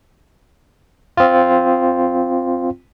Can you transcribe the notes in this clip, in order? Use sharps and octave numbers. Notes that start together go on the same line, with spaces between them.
C4 F4